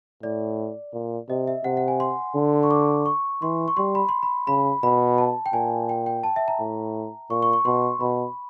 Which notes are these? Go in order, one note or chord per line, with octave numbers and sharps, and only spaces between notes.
A2 D5
A#2
C3 D#5
E5
C3 F#5
F#5
G#5
C6
D3
C#6
D6
C#6
E3 C6
C#6
G3 C6
B5
C6
B5
C#3 B5
B2 B5
A5
G5
A#2 G#5
G5
G5
A5
E5
A#5
A2
A#2 C#6
C#6
C#6
B2 C6
B2 B5